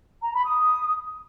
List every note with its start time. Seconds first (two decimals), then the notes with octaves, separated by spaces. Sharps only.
0.22 A#5
0.33 B5
0.44 D#6